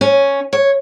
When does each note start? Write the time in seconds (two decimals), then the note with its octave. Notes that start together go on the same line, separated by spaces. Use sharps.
0.01 C#4
0.53 C#5